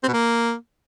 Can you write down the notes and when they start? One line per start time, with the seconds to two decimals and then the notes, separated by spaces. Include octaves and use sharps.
0.03 C4
0.08 B2
0.13 A#3